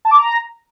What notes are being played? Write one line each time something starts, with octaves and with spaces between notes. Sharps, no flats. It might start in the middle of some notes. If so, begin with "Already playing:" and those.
A5
D6
A#5